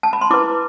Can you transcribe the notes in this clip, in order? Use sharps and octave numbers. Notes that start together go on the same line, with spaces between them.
A5
B5
C6
E4 B4 D6